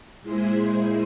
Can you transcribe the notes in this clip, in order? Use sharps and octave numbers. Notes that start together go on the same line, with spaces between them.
A#2 G#3 E4 G#4 C5